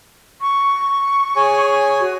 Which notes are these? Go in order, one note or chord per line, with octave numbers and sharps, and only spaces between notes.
C#6
G#4 C#5 G#5
F#4